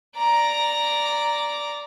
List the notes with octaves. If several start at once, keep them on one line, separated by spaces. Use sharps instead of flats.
D5 A#5